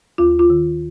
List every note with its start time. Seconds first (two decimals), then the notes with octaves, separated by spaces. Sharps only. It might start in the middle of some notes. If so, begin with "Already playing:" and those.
0.18 D#2 F4
0.39 F4
0.50 D#3